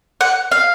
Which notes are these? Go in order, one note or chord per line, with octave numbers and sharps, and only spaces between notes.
F#5
F5